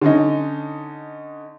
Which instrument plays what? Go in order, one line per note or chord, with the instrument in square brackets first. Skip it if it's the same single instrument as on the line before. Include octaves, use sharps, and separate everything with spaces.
[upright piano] D3 C#4 D#4